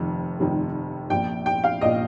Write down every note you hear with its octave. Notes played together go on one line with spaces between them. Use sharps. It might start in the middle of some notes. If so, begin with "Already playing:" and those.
Already playing: F1 F2 D#3
F1 F2 D#3
A#1 A#2 G5
G5
F5
A#1 A#2 D#5